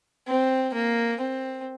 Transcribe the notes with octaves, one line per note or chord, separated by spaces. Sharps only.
C4
A#3
C4